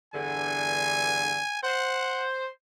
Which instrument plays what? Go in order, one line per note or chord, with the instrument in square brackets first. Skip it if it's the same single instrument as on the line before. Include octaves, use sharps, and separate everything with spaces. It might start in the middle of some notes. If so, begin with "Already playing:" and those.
[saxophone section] E2 G2 D3 [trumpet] G#5
[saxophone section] C5 [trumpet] F#5